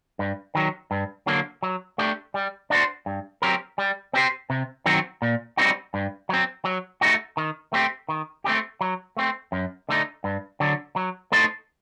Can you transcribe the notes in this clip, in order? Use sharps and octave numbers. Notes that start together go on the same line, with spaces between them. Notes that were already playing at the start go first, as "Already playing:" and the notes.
G2
D#3 F#3
G2
D3 F#3 A#3
F#3
A3 D4 G4
G3
D4 F#4 C5
G2
F#3 C4 G4 A#4
G3
C4 G4 C5
C3
D#3 F#3 C4 F#4
A#2
G3 C4 D#4 F#4
G2
F#3 C4
F#3
A3 C4 D#4 F#4
D#3
A3 C4 G4
D#3
A3 C4 D#4 G4
F#3
A3 C4
F#2
D3 A3 D#4
G2
D3 F#3
F#3
A3 D#4 A4 C5